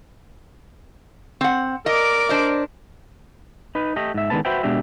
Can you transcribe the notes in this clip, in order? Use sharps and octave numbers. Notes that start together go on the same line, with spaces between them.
C4 F#5
A#4 D5 D#5 D6
D4 C5 D#5
D#4 B4
A3 G4 D#5
G#2 E5
D3 D#3 G#3 B3 B4 A5
F#4 B4 C5 E5 G5
B2 G#3 D4 G4 E5